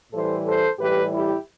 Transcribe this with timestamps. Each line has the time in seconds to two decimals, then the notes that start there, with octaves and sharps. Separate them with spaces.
0.12 A2 E3 G3 A4 C5
0.46 A4 C5
0.79 A2 E3 G3 G4 B4
1.13 E4 G4